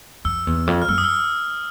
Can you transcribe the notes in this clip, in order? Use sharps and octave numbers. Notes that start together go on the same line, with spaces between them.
F2 E6
E2
F2
F6
F#2 E6
D#6
E6